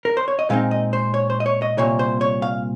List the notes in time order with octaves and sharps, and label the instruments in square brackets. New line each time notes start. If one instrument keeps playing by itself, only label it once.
[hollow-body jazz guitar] A#4
C5
C#5
D#5
A#2 G#3 C4 D#4 F5
D#5
C5
C#5
C5
D#5
C#5
D#5
C2 A#2 G3 C#5
C5
C#5
F5